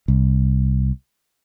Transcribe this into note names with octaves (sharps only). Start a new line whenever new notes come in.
C2